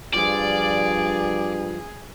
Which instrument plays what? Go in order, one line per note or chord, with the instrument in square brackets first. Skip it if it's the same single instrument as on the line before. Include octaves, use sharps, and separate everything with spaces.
[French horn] G2 [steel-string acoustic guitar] F3 F4 [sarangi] G#4 [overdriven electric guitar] D5